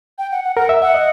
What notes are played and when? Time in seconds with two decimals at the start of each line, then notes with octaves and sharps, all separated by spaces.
0.18 G5
0.32 F#5
0.44 F#5
0.56 A#4 F#5
0.69 E5
0.82 E5 F#5
0.94 D#5